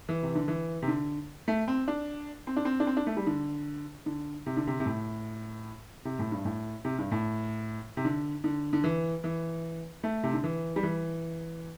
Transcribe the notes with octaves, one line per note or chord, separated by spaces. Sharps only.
E3
C3
D3
E3
C3
D3
A3
C4
D4
C4
D4
C4
D4
C4
D4
A3
G3
D3
D3
C3
D3
C3
C3
A2
C3
A2
G2
A2
C3
G2
A2
C3
D3
D3
D3
E3
E3
A3
C3
D3
E3
G3
E3